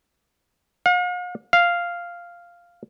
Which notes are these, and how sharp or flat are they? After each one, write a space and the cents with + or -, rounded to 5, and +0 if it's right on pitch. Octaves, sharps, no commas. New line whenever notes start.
F5 +45
F5 -5